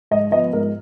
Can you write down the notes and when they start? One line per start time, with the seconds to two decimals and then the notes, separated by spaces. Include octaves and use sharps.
0.11 G#2 D#5
0.31 F3 B3 D#5
0.53 G#2 A#4